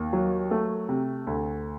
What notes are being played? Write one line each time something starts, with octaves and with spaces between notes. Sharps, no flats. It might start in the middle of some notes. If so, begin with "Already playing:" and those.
Already playing: D#2
F#3
A3
C3
D2